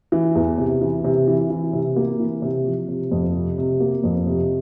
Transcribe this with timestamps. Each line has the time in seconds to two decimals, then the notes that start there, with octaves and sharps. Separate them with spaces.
0.12 E3
0.35 E2
0.58 C3
0.81 E3
1.04 C3
1.28 E3
1.50 E3
1.73 C3
1.96 A#3
2.20 E3
2.42 C3
2.66 F3
2.88 C3
3.11 F2
3.34 C3
3.58 C3
3.80 A#3
4.04 F2
4.27 C3